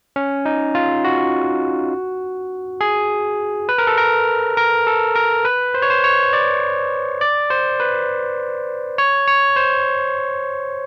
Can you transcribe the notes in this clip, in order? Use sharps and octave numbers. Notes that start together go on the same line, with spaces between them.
C#4
D#4
F4
F#4
G#4
B4
A#4
A4
A#4
A#4
A4
A#4
B4
C5
C#5
C5
C#5
D5
D5
C5
B4
C#5
C#5
C5